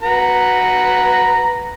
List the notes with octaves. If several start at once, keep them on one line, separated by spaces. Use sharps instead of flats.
F#4 B4 A#5